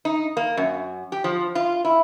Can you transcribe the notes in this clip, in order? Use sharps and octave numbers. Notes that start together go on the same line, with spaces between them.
D#4
A#3
F#2
G4
F3
F4
E4